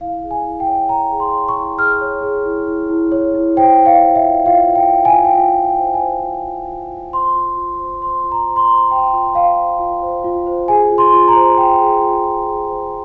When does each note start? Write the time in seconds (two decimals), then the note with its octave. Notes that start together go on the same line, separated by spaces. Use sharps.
0.01 E4 F5
0.23 G#4
0.31 G#5
0.45 E4
0.60 G5
0.68 C#5
0.89 C#5 A#5
1.12 G#4
1.20 C6
1.35 C#5
1.48 C#6
1.57 E4
1.79 G#4 F6
2.01 C#5
2.23 G#4
2.45 E4
2.67 E4
2.89 E4
3.12 C#5
3.35 E4
3.56 C5 G5
3.78 C5
3.86 F5
4.02 C5
4.15 E5
4.24 F4
4.46 F4 F5
4.68 F4
4.75 G5
4.90 F4
5.05 G#5
5.13 F4
5.25 G5
5.35 F4 G#5
5.57 F4
5.64 G5
5.79 C5
5.94 G#5
6.01 C5
6.24 F4
6.46 F4
6.68 F4
6.90 F4
7.13 C5 C6
7.35 F4
7.57 F4
7.79 C5
8.01 C5 C6
8.24 F4
8.32 A#5
8.46 C5
8.56 C6
8.62 A#5
8.68 C5
8.91 C5 G5
9.13 F4
9.35 C5 F5
9.58 C5
9.79 F4
10.02 C5
10.24 F4
10.47 C5
10.68 G#4 G#5
10.92 F4
10.98 C6
11.13 F4
11.28 A#5
11.35 C5
11.57 C5 G5
11.81 G#4
12.02 F4
12.25 F4
12.47 G#4
12.69 C5